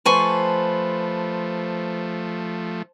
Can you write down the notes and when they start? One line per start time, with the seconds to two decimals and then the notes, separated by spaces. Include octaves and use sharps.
0.05 F3 A3 B4 C5 G#5 A5 C6 C#6